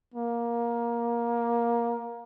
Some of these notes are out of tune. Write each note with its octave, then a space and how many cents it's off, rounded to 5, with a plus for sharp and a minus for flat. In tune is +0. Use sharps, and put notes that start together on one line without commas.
A#3 +15